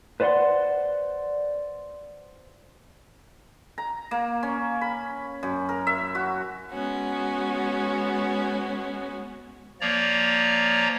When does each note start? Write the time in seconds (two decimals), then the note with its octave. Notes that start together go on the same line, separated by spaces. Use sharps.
0.20 B4 C5 D5 F5 F#5 C6
3.78 A#5
4.11 A#3
4.43 C#4
4.81 B5
5.43 F#2
5.69 A#4
5.87 E5
6.15 F#4
6.70 G#3 B3 C#4 F#4
9.81 F3 A#3 C#5 D5 A#5